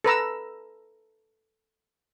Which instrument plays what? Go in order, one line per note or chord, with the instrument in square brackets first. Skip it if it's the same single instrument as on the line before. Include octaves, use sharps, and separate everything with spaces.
[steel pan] A4 B4 A#5 E6